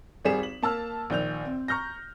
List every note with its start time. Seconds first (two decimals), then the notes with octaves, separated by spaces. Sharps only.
0.25 G#1 G3 G#4 B6 E7
0.43 F#7
0.62 A#3 A5 E6 F6
1.10 A#1 D#3 G6 F7
1.45 C4
1.68 A#5 C#6 F6 G6 A#6